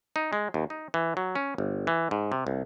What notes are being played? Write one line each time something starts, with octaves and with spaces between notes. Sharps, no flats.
D#4
G#3
D#2
D#4
E3
F#3
C#4
G1
E3
G#2
C3
C2